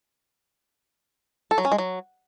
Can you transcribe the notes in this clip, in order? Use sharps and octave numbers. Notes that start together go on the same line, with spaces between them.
A4
F#3
C#4
G#3
F#3